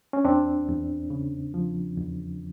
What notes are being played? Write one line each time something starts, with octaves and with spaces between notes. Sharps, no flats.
C#4
E2 C4 D4
E2
C#3
F3
E2